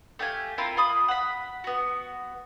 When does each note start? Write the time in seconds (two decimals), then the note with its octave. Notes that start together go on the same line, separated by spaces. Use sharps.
0.19 A3 G4 F5 G#5
0.58 C4 E4 F4 A#4
0.77 F4 B5 D#6
1.08 F#5 B5
1.64 B3 F#4